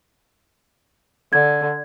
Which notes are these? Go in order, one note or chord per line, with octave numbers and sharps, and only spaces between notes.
D3 G#6